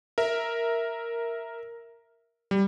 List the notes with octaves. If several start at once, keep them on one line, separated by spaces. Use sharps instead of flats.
A#4 E5
G3